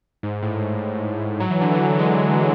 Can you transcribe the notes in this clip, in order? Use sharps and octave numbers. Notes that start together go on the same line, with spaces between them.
G#2
A2
F#3
E3
D3
E3
G#3